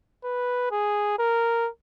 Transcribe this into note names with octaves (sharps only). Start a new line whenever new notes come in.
B4
G#4
A#4